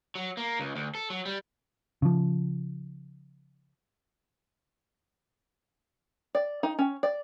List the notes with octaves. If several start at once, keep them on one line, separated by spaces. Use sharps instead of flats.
F#3
A#3
C#2
D2
A4
F#3
G3
C#3 F3
D5
D#4
C#4
D5